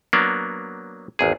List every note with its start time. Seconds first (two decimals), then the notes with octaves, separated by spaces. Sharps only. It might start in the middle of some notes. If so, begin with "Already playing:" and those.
0.13 F#3 A#3 B3 D4
1.19 G#1 E2 G#4